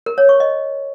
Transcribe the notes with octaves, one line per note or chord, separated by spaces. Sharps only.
A#4
C#5
C#6
D#5